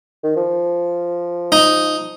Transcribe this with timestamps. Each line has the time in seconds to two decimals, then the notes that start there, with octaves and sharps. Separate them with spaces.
0.23 D#3
0.36 F3
1.52 D#4